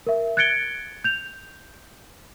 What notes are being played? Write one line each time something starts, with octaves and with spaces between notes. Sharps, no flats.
A#4 E5
F#6 G#6 A6 C#7 D7 G7
G6 F7